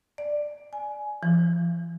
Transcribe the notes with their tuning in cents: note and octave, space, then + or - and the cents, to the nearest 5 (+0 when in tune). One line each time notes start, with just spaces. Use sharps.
D5 +5
G#5 +15
F3 -45